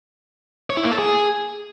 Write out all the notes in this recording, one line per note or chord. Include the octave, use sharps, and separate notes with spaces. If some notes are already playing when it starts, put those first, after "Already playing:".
C#5
E4
A#3
A4
G#4